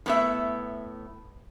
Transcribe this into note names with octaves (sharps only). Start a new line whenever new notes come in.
A2 B3 E5